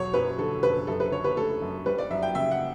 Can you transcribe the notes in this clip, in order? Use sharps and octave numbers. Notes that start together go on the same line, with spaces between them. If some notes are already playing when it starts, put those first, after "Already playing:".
Already playing: E1 F#3 C#5
F#2 B4
D3 A4
F#1 B4
F#2 A4
B4
D3 C#5
B4
A3 A4
F#2
G3 B4
D5
F#2 E5
G5
C#3 E5
F#5